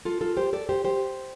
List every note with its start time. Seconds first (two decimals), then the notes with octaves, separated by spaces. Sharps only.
0.05 F4 A4
0.21 F4 A4
0.37 G4 C5
0.53 A4 D5
0.69 G4 C5
0.85 G4 C5